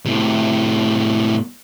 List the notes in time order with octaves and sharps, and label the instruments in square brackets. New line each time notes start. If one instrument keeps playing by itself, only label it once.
[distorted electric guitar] A2 C3